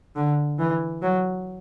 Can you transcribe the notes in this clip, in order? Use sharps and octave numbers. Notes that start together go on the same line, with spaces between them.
D3
E3
F#3